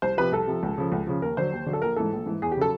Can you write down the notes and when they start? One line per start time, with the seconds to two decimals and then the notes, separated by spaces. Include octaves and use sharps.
0.02 C2 C5
0.17 C3 F3 B4
0.32 C2 A4
0.47 C3 F3
0.63 C#2
0.78 C#3 F3
0.92 C#2
1.07 C#3 F3
1.22 D#2 A#4
1.37 D3 F#3 C5
1.52 D#2
1.66 D3 F#3
1.73 A4
1.82 A#1 A#4
1.96 G#2 E3 A4
2.12 A#1
2.26 G#2 E3
2.42 E2 G#4
2.52 G4
2.57 C#3 F#3 A4